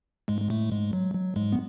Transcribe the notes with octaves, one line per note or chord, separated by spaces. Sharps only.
G#2 G#3
G#3
A2 A3
G#2 G#3
F#3
F#3
G#2 G#3
B3